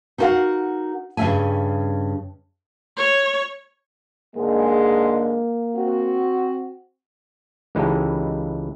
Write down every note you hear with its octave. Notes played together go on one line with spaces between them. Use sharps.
D#4 E4 F#4 A#4 F5 F#5
G2 C#3 A#3 C4 E5 G#5
C#5
G#2 D3 G#3 A#3
C4 F#4
C#2 E3 G#3 D#4 G4 A4